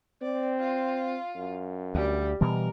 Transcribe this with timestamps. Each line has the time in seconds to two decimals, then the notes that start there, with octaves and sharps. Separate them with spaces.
0.22 C4 D5
0.59 F4
1.36 F#2
1.95 D2 G3
2.41 B2 E3 G3 A#4